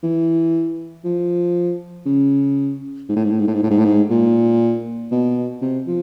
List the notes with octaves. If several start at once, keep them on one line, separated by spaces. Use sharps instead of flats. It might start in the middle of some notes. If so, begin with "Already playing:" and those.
E3
F3
C#3
G#2
A2
G#2
A2
G#2
A2
G#2
A2
G#2
A2
G#2
A#2
B2
C3
F3